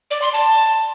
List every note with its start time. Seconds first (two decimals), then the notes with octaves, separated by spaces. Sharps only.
0.11 D5
0.22 C6
0.33 A5